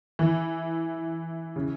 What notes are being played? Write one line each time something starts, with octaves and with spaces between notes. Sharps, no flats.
E3
C#3